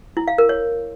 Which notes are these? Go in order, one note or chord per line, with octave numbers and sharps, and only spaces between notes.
E4
F5
A#4
C#5